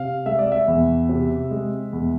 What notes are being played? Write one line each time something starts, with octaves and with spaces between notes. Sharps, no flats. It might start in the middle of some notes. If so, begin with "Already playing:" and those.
Already playing: C3 F5
G#3 E5
D5
E5
E2
C3
G#3
E2